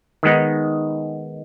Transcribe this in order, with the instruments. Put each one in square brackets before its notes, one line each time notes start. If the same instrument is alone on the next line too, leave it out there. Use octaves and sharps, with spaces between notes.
[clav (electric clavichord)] D#3 G#3 B3 D#4